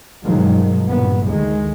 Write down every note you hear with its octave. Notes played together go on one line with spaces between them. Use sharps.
G2 B2 D#3 F3 F#3 G#3
F#1 G2 A#2 B3
D2 D#3 G#3